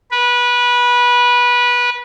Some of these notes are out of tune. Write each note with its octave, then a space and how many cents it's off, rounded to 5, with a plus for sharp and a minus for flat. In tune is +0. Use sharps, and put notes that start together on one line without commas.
B4 -20